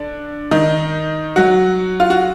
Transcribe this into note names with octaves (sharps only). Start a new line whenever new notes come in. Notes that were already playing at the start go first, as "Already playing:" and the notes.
Already playing: D3 D4
D#3 D#4
F#3 F#4
F4
F#4